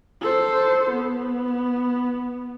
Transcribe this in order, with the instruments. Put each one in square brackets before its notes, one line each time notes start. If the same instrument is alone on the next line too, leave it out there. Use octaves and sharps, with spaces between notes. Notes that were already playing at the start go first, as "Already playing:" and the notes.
[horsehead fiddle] A4 C5
B3